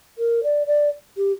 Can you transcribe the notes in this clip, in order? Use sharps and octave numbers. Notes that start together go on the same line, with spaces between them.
A#4
D5
D5
G4